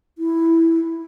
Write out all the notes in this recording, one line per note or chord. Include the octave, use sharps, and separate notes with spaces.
E4